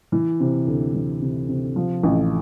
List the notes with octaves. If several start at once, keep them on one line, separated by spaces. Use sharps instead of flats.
E3
C3
D2
E3
C3
C3
F3
A1